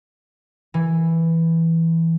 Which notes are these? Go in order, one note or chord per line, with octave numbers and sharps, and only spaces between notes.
E3